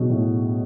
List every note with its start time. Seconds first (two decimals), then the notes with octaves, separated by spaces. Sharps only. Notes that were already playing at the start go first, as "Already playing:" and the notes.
Already playing: B2 F#3 G#3
0.09 A2